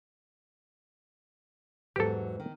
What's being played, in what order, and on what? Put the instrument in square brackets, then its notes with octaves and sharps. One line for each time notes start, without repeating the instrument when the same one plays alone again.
[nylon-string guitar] E2 G#2 F#3 [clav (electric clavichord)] G4 A4
[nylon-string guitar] D#3